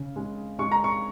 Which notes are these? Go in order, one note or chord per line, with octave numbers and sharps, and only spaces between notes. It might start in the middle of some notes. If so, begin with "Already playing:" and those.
Already playing: C#3
G#3
G#3 C#6
A#5
C#6